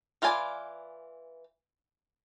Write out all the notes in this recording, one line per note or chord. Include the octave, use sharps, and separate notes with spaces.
E3 F4 B4 D5 G#5